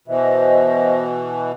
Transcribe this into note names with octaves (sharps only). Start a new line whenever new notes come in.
B2 E3 C5 D#5 E5